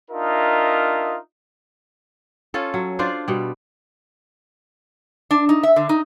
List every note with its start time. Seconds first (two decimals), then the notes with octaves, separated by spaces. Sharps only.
0.11 D4 D#4 F4 A#4 D#5 E5
2.54 C#4 F4 A4
2.74 F#3
2.99 D4 F4 C5 D5
3.28 B2 G3
5.31 D4
5.49 D#4
5.63 E5
5.76 D3
5.89 D#4